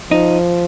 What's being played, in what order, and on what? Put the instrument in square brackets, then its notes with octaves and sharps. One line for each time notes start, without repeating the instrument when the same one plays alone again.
[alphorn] F3 [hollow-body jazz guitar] D#4